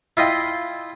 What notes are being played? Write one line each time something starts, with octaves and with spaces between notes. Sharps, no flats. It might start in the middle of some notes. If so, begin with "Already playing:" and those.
E4 F4 D#5 G5